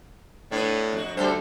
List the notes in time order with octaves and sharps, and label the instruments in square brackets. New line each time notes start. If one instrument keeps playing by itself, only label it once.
[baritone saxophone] A2 [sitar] B3 D4
[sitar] F2 F#4
[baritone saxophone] D2 [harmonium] G3 D4 [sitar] G4 A4 C5